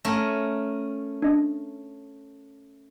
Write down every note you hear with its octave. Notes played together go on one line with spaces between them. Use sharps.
A3 C#4 A#4
D4 D#5